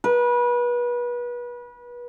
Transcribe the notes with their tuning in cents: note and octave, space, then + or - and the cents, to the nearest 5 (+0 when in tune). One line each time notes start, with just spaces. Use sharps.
B4 -30